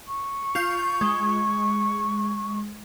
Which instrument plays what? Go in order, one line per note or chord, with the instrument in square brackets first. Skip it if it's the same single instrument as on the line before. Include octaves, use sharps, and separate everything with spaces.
[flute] C#6
[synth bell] F4 G6
G#3